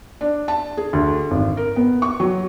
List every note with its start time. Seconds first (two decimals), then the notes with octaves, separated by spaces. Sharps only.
0.21 D4
0.48 A5
0.77 G#4
0.93 D2
1.31 G#1
1.57 A#4
1.76 B3
2.02 C#6
2.20 F#3